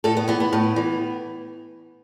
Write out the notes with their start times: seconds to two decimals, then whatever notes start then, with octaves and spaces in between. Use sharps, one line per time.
0.04 A2 A4
0.17 B3
0.28 E3 B3
0.40 B3
0.53 A2
0.76 E3